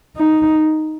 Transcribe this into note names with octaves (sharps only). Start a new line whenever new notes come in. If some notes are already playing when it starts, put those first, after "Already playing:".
D#4